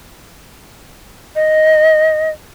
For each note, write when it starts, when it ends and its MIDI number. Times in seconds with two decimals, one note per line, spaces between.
1.36 2.30 75